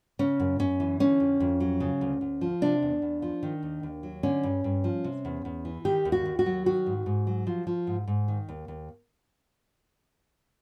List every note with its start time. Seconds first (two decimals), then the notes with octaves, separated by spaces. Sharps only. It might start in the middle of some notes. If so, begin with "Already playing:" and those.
0.19 C#3 C#4
0.40 F#2
0.59 F#2 C#4
0.80 E3
1.00 D3 C#4
1.20 F2
1.40 F2
1.60 F#3
1.80 C#3
2.01 D2
2.21 D2
2.41 F3
2.61 C3 D4
2.82 E2
3.02 E2
3.22 F3
3.43 D#3
3.63 D#2
3.83 D#2
4.03 F#3
4.23 D3 C#4
4.43 G2
4.64 G2
4.84 F3
5.04 C3
5.25 E2
5.45 E2
5.65 E3
5.85 D#3 G4
6.05 D#2
6.12 F#4
6.26 D#2
6.39 F#4
6.46 F#3
6.66 D#3 F#4
6.86 G#2
7.06 G#2
7.27 F#3
7.47 F3
7.67 F3
7.87 G#2
8.07 G#2
8.28 D#3
8.49 D#2
8.68 D#2